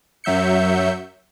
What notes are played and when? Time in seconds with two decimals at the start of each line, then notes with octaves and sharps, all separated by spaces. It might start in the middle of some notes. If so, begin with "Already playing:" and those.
0.24 F#2 F#3 E5 G6 C#7